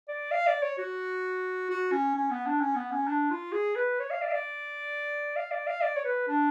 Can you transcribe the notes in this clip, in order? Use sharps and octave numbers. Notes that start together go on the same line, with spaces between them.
D5
F5
D5
C#5
F#4
F#4
C#4
C#4
B3
D4
C#4
B3
C#4
D4
F4
G#4
B4
C#5
F5
D5
F5
D5
F5
D5
F5
D5
C#5
B4
D4